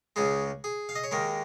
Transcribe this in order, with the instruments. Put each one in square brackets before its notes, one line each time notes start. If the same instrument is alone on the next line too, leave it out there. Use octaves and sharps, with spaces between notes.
[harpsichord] C#2 C#3 G#3 G#4
G#4
F5
D#5
C#5
D#2 D#3 G#3 A#4